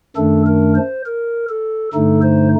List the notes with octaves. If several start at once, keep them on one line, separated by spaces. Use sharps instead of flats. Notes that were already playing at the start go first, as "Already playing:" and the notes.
F#2 D#3 A3 D4 A4
A#4
C5
A#4
A4
G2 D3 A3 D#4 A4
C5